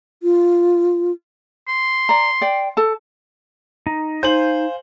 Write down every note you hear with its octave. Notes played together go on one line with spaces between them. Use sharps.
F4
C6
D5 A#5
D5 G5
A4 A5
D#4
D#4 C5 F5 G#5 G6 F#7